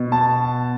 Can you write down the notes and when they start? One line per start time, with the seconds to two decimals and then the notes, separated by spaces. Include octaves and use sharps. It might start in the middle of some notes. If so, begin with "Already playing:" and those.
Already playing: B2
0.12 A5